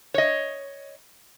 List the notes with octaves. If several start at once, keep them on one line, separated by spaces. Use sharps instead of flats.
C#5 D#5